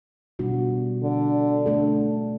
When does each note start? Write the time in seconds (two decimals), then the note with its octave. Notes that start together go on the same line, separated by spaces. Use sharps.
0.39 B2 G3 B3 D4 F#4
1.03 D3
1.66 A3 D4 A4